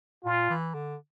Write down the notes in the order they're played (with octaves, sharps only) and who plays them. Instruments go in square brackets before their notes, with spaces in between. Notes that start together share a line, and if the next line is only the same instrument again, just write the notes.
[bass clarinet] A#2 [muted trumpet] F4
[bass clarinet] E3
D3